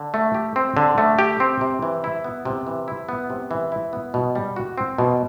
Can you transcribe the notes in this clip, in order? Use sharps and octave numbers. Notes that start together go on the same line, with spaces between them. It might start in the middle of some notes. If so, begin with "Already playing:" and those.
Already playing: D3
A3
G4
C4
D3
A3
G4
C4
C3
E3
E4
B3
C3
E3
E4
B3
C3
E3
E4
B3
B2
G3
F#4
C4
B2